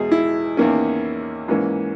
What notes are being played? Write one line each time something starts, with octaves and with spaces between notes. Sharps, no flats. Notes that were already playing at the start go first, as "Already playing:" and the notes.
Already playing: E2 B2 G#3 G#4
E4
E2 D#3 A#3 C#4
G#2 E3 A#3 C#4